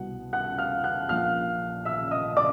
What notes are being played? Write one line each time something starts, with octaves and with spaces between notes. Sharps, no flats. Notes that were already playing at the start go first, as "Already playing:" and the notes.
Already playing: C2 B2 F#5
F#5 F#6
F5 F6
F#5 F#6
A#1 A#2 F5 F6
E5 E6
D#5 D#6
D5 D6